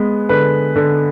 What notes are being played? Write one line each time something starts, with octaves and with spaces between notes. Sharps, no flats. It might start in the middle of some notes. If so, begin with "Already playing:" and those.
Already playing: G#3 B3
D3 B4
D3